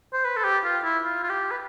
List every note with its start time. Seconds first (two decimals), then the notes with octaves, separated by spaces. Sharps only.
0.13 C5
0.25 B4
0.37 A4
0.44 G4
0.64 F4
0.83 E4
1.04 F4
1.23 F4
1.29 G4
1.51 B4